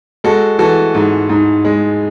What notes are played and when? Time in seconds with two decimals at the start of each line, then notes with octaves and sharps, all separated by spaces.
0.24 G#3 F#4 A4
0.59 E3 F#4 A4
0.95 G#2
1.29 G#2
1.65 G#3